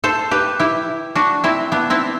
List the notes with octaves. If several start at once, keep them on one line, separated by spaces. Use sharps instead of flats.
A4 C5
G4 B4
E4 G4
D4 F#4
C4 E4
B3 D4
C4 E4